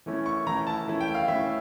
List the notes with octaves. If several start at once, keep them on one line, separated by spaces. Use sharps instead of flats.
E3 A3 C#4 E4
C#6
E3 A3 C#4 E4 A#5
A5
E3 A3 C#4 E4
G5
F5
E3 A3 C#4 E4 E5